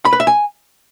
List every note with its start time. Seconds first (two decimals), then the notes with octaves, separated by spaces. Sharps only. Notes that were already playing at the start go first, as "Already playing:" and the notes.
0.05 B5
0.13 B4
0.20 E5
0.27 G#5